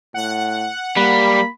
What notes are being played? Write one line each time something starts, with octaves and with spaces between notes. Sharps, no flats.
A2 F#5
G3 A#3 B5